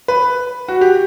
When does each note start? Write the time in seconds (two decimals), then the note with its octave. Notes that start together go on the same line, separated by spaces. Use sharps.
0.08 B4
0.68 F#4
0.81 G4